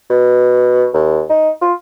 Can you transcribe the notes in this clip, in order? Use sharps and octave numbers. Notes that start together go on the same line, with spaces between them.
B2
D#2
D#4
F4